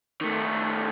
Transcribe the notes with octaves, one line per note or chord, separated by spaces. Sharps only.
D#3 A3